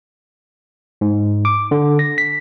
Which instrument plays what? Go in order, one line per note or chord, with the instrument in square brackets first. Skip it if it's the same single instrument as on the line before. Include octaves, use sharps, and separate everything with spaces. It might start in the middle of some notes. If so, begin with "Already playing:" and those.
[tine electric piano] G#2
D6
D3
A#6
B6